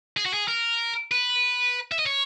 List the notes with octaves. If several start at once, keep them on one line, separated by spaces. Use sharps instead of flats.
G#4
F#4
G#4
A#4
B4
E5
D#5
C#5